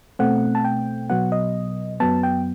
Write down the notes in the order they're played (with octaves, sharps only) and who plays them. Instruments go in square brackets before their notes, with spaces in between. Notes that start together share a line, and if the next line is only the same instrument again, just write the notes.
[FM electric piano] B2 A3 C4 F#5
A5
G5
B2 F#3 B3 F#5
D#5
F#2 F#3 B3 A5
G5